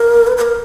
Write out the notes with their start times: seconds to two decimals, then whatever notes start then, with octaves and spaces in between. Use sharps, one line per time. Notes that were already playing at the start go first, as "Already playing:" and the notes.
Already playing: A#4
0.27 B4
0.37 B4
0.41 A#4